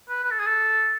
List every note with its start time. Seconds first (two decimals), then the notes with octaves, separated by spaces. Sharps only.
0.09 B4
0.24 B4
0.31 A4
0.39 G#4
0.46 A4